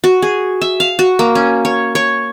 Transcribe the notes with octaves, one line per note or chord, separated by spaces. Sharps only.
F#4
G#4
E5
F5
F#4
A#3
C#4
C#5
C#5